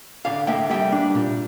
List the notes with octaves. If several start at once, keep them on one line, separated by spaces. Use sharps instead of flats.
D3 D5 F5
A#3 E5 G5
G3 E5 G5
D4
A#2